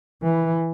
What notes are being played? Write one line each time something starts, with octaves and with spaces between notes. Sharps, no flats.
E3